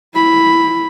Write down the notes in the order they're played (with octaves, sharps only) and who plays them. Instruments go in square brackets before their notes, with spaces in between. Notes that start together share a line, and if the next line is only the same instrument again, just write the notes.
[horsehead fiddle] E4 B5